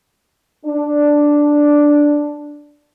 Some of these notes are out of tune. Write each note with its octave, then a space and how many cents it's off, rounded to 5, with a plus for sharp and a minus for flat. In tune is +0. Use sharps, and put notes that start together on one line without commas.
D4 +0